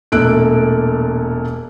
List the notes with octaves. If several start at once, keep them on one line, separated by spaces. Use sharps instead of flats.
E1 A#2 A3 E6 F#6 D7